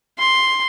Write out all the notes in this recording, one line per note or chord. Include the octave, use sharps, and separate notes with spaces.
C6